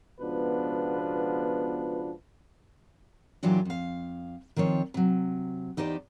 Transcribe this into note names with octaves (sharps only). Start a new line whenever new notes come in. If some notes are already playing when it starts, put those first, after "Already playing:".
C#2 B2 F3 B3 D4 B4
A#2 E3 F#3 D4 F4 G4
F2 F5
D#3 F3 C4 C#5
C3 F#3
E2 D#4 G4 C5 D5